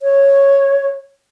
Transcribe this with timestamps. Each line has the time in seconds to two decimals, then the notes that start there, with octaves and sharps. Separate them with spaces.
0.01 C#5